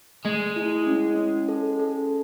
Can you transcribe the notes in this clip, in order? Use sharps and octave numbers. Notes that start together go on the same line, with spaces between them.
G#3 A3
E4
C#4
C#4
A4
A4